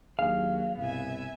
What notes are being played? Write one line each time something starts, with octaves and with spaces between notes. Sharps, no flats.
D#2 F#3 A#3 D4 G#4 F5
C2 G2 B2 B3 E5 G#5